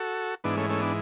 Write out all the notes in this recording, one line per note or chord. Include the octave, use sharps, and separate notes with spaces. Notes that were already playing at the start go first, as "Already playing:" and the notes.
Already playing: F#4 A4
G#2 E3 B3 D4
A3 C#4
A3 C#4
B3 D4